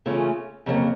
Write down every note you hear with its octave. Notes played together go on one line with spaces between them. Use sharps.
C#3 E3 A3 C#4 F4
F2 C#3 F#3 A#3